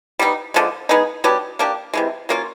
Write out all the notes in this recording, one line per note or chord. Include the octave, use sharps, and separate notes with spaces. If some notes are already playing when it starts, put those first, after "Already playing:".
G3 B3 D#4
D3 F3 G#3
G#3 B3 D#4 G#4
F#3 B3 D4 G4
A#3 D4 G4
C3 E3 G#3
F#3 A#3 C#4 F4